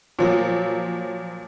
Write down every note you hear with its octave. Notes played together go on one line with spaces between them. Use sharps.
A#2 F3 F#3